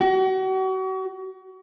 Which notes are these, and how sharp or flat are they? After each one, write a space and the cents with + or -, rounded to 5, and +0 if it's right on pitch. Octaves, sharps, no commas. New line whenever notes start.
F#4 +35